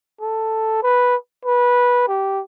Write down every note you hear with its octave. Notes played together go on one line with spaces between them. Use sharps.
A4
B4
B4
G4